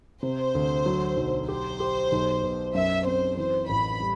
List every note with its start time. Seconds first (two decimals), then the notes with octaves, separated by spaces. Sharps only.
0.23 C3 C5
0.55 D2
0.86 F#3
1.17 B1
1.48 G4 C5
1.80 G4
2.12 B1
2.43 B2
2.74 F#2 E5
3.06 C4 C5
3.37 E3 C5
3.69 A1 B5
4.00 G3